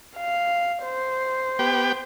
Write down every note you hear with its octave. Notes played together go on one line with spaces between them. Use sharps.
F5
C5
B3 G4 G5